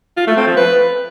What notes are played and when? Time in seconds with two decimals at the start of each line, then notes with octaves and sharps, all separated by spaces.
0.17 F4
0.27 A3
0.37 C4
0.47 F3
0.57 B4